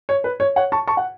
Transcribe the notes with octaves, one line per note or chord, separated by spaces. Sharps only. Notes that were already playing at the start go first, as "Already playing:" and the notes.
C#5
B4
C#5
C#5 F#5
A5 C#6
A5 C#6
F#5